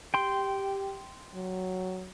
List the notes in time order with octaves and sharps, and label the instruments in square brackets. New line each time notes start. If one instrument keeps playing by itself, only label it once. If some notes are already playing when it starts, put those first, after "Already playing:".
[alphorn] G4 [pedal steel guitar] G5 C6
[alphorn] F#3